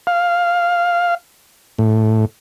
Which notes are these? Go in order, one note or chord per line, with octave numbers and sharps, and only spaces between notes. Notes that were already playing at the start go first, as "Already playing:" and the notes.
F5
A2